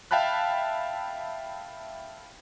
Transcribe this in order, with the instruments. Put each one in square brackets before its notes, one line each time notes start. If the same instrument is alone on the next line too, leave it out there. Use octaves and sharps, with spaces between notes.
[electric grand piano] E5 F5 G5 A5 B5 F#6